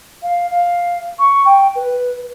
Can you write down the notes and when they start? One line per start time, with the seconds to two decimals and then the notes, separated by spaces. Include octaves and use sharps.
0.23 F5
0.50 F5
1.19 C#6
1.46 G5
1.75 B4